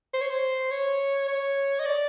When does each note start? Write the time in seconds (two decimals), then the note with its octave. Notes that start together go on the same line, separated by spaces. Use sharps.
0.13 C5
0.21 C#5
0.30 C5
0.71 C#5
1.28 C#5
1.80 D#5
1.85 D5